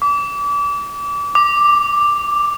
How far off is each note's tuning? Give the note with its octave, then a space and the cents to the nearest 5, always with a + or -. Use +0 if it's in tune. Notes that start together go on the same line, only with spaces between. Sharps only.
D6 -35
D6 +5